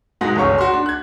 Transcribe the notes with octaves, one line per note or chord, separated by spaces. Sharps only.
G#2 B2 G#3 A#6
G1 C#2 C#4 C#6
F#4 C6
D4
F#6 G#6